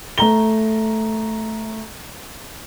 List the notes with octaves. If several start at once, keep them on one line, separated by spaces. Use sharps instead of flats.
A3 A#5 G7